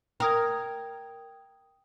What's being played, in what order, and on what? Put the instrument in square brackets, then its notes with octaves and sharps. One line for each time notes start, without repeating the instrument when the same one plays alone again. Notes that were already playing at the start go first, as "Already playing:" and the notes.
[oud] A#4 [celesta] G5 D#6 G#6